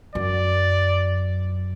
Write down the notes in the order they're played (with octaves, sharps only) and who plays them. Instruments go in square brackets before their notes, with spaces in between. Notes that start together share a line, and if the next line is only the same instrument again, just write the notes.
[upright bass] F#2 [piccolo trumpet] D5